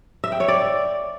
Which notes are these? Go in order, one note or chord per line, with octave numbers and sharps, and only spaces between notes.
E5
G5
C#5
D5